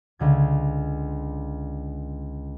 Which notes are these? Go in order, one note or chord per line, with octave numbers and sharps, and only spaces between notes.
C#2 D3 G#6